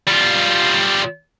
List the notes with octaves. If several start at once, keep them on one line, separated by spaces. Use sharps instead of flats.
G3 F4